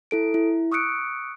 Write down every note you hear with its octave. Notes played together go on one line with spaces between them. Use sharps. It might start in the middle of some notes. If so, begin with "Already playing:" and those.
E4 A4 D7
E4
C#6 D#6 E6 F#6 C#7 D7